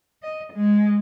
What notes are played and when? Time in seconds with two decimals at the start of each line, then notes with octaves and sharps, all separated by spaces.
0.23 D#5
0.53 G#3